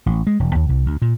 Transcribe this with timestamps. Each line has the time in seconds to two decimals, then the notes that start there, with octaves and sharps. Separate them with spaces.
0.06 A1
0.27 G#3
0.40 E1
0.55 D#2
0.69 C2
0.86 D2
1.02 A#2